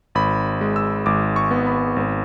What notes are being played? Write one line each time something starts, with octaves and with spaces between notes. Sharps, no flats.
G#1 B5
G#3
E6
G#1 D6
C#6
B3
B5
G#1